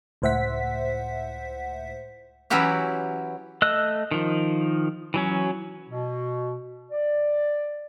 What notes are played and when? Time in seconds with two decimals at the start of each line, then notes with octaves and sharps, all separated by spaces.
0.22 C#2 A2 C5 E5 F#5 B6
2.50 E3 F#3 C#4 E4 F#4 G4
3.62 A3 D#5 E6 F#6
4.11 D#3 F3
5.14 E3 F#3 C#4
5.89 B2
6.90 D5